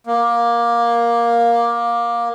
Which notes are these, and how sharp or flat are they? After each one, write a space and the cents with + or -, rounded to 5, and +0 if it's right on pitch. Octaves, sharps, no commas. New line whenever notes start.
A#3 +15